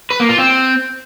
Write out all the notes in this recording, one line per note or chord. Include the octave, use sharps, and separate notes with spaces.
B4
A#3
F4
C4